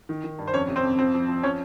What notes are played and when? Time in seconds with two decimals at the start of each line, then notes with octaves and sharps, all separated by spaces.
0.09 D#3
0.24 D#3
0.39 G2
0.48 C5
0.53 F2 C#4 C#5
0.68 C3
0.76 C4 C5
0.84 F2
0.99 F3 C4 C5
1.14 F3
1.28 F3
1.43 F3 C#4 C#5